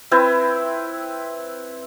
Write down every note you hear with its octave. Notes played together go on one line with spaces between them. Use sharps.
C4 E4 B4